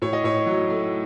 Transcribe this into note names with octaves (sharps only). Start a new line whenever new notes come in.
A2 C#5
D#5
A2 C#5
F#3
A3